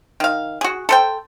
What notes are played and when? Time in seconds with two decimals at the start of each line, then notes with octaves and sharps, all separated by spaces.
0.20 D#3 F5
0.61 F#4 G#4
0.89 A4 C5 G5